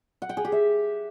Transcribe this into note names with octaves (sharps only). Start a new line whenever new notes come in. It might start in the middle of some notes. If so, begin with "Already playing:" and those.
F#5
G5
G#4
G4
E5